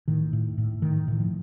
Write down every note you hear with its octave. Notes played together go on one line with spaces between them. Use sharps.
A2 D#3
A2
A2
A2 D#3
A2 D#3
F3